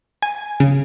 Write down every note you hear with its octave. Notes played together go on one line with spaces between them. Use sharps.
G#5
C#3